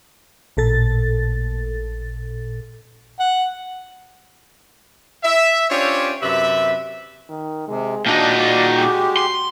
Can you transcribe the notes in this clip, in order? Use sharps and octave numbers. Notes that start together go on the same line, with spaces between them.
A1 A#2 A4 A6
F#5
E5
C#4 D4 F4 G4 C5 C#5
F#2 C3 B4 E5
D#3
C3 G#3
A#2 D4 D#4 F#4
D5
G#3 G4
C6